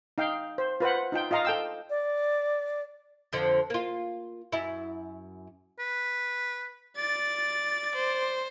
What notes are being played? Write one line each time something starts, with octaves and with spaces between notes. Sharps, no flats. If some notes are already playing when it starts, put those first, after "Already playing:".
D#4 F5 G5
C5
F4 B4 C5 F#5
D#4 F4 G5
F4 D#5 F5 A#5
A4 G5 E6
D5
F2 D3 F3
A#3 F4
F#2 E4
B4
D5 A6
C5